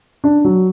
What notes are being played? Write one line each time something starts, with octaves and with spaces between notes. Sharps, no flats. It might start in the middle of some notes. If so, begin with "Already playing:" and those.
D4
F#3